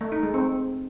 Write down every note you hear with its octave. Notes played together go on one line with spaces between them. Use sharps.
A3
D#4
G#3
C4